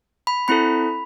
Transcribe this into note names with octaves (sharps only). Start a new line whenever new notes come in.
B5
C4 E4 A4 B5